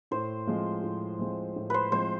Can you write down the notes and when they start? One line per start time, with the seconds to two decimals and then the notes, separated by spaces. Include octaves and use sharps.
0.11 A2 C5
0.47 F3 G#3 C4 F4
0.83 A2
1.19 F3 G#3 C4 F4
1.56 A2
1.70 B4 C5
1.92 F3 G#3 C4 F4 C5